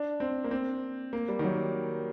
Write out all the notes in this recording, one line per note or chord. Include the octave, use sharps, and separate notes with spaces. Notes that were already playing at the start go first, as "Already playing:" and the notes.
Already playing: D4
C4
A#3
C4
A#3
G3
D#3
F#3